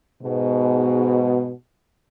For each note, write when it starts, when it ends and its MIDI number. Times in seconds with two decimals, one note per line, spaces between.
0.23 1.52 44
0.23 1.52 47